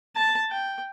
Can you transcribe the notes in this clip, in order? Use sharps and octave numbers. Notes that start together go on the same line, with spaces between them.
A5
G5